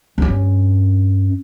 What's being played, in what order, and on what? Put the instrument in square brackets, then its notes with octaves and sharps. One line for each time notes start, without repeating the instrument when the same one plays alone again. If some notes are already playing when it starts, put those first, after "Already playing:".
[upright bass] G2 C#4